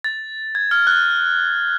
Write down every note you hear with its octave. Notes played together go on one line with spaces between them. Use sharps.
A6
G#6
F6
F#6